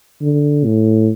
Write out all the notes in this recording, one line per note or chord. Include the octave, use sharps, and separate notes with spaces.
D3
A2